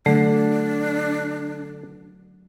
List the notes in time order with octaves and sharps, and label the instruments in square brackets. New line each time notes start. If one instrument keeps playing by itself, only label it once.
[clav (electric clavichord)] D3 [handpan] F#3 [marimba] A3 [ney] D4